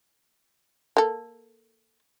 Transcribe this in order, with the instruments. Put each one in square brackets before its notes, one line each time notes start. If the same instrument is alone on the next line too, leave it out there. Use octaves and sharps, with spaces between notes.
[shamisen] A#3 A4